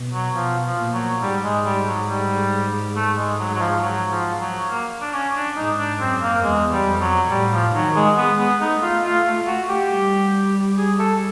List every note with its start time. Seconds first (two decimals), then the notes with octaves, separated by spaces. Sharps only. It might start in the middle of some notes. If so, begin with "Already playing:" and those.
Already playing: B2
0.13 F#3
0.35 B2 F3
0.64 F3
0.79 A#2
0.93 F#3
1.22 G#2 G3
1.44 G#3
1.65 G3
1.88 F#3
2.09 G3
2.96 A3
3.17 G#3
3.39 F#3
3.55 F#3
3.61 F3
3.83 F#3
4.12 F3
4.40 F#3
4.69 A#3
5.01 D4
5.13 C#4
5.35 D4
5.56 G#2 D#4
5.78 D4
6.00 F#2 C4
6.22 A#3
6.43 E2 G#3
6.72 G3
6.86 F2
7.01 F#3
7.29 A2 G3
7.52 F3
7.73 D#3 F#3
7.95 G#3
8.17 G#3 B3
8.38 B3
8.61 A3 D#4
8.82 F4
9.04 F4
9.26 F4
9.47 F#4
9.69 G4
9.90 G3
10.77 G#4
10.99 A4